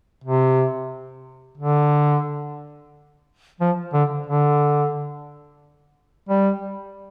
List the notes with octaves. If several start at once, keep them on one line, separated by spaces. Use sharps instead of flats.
C3
D3
F3
D3
D3
G3